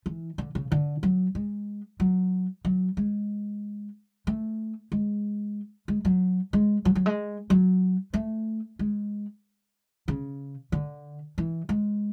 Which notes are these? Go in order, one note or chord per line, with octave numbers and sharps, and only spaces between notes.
E3
D3
C#3
D3
F#3
G#3
F#3
F#3
G#3
A3
G#3
G#3
F#3
G#3
F#3
F#3
G#3
F#3
A3
G#3
C#3
D3
E3
G#3